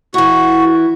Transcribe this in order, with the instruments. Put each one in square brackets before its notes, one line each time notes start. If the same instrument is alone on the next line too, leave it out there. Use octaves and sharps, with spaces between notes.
[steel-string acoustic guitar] E3 E4 [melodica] F#4